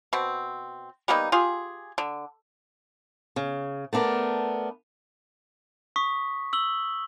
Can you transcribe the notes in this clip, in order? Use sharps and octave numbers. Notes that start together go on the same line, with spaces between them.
B2 C4
G3 A#3 B3 D#4
F4 G4 G#4
D3
C#3
A3 B3 D4 A#4
C#6 D#6 B6
E6 F#7 G7